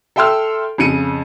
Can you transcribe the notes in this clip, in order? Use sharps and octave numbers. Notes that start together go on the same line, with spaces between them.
A4 E5 G5 C6 E6 F6
F2 C#3 C#7 D#7